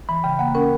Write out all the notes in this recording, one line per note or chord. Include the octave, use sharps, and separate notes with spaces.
E3 B5
C#3 G5
A#3 F#5
C#4 A#4